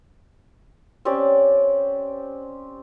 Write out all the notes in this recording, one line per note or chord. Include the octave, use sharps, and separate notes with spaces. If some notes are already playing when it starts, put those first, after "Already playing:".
C4 C#4 G4 D5